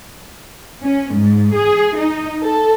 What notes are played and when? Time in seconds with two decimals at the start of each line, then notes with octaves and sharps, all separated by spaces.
0.82 C#4
1.13 G#2
1.55 G#4
1.97 D#4
2.41 A4